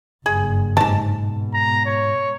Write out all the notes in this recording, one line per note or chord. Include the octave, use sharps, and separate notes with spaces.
F#1 G2 G#4
C#2 G#2 A5
B2
A#5
C#5